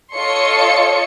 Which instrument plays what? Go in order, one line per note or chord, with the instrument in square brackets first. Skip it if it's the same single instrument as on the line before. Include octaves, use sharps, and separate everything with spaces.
[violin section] F4 A4 C#5 D#5 C6 C#7